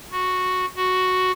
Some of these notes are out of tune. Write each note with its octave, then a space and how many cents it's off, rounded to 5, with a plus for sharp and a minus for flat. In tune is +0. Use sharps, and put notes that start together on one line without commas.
F#4 -5
F#4 +0